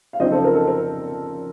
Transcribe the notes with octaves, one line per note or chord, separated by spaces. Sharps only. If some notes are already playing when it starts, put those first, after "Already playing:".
F5
F2 C#3 F3 C4 D#4 C5 D#5
A4 C5
A#4
A4
A#4